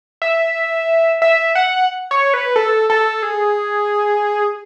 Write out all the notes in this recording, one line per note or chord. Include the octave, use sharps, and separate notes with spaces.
E5
E5
F#5
C#5
B4
A4
A4
G#4